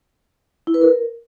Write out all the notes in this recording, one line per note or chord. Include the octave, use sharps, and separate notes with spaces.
E4
B4
A#4